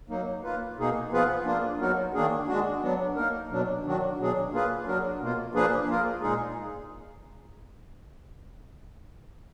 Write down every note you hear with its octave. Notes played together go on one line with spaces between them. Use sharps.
F#3 A#3 D#4
A#3 F4 B4
B2 A#3 D#4 G#4
F3 B3 F4 G#4 B4
A#3 D4 F4
F#3 B3 D#4 F#4 A#4
D#3 A#3 D4 G#4
G#3 D4 F#4
F#3 B3 D4
A#3 D#4 A#4
B2 F#3 D4
D#3 F#3 D4 F#4
B2 F#3 D4 G#4
A#3 F4 G#4 B4
F#3 D4 F#4 A#4
B2 A#3 F4
F3 A#3 D4 G#4 B4
A#3 F4 A#4
A#2 G#3 D#4 G#4